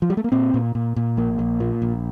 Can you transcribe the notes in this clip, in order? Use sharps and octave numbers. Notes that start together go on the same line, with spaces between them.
F3
G3
A3
A#3
A#2 C4
A#2
A#2
A#2
A#1 A#3
A#1
A#2
A#1